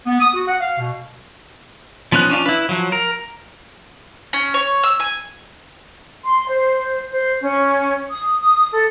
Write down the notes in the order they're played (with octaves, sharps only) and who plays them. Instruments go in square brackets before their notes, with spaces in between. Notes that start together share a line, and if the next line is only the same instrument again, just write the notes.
[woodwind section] B3
D#6
F#4
F#5
F5
B2
[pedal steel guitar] F3 B3 C#4 D#4 F#6
C#4 D4 F4
E4 B4
F3 F#3
A#4
[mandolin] C#4
C#5
E6
G#5
[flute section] C6
C5
C5
C#4
D#6
D#6
A4